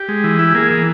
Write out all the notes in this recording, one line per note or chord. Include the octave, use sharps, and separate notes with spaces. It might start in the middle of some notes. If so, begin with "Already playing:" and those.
Already playing: G4
G#3
E3
E4
A#3 G#4
E3